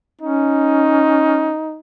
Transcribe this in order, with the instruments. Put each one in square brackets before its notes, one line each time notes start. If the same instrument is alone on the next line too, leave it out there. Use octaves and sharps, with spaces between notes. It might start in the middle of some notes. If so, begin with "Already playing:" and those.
[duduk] C#4 [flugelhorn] D#4